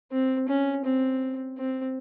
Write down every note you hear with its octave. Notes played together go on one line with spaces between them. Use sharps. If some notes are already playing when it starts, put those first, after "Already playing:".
C4
C#4
C4
C4